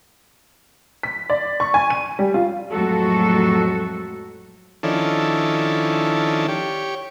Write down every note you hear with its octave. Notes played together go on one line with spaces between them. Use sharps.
B6
D5
C#6
G#5
D#7
G3
F4
F2 A2 F#3 G#3 F#4 A4
D#3 F3 C#4 D4 E4 A4
G4 C#5